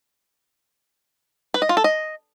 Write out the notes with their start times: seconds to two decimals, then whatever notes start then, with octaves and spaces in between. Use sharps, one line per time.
1.54 B4
1.62 D#5
1.69 F4
1.77 A4
1.84 D#5